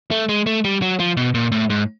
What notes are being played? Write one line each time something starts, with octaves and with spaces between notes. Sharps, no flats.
A3
G#3
A3
G3
F#3
F3
B2
A#2
A2
G#2